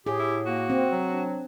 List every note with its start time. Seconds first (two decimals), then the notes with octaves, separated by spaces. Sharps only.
0.07 A2 G4 G#4
0.19 E4
0.46 A#3 F#4
0.70 C4
0.91 F#3
1.10 D4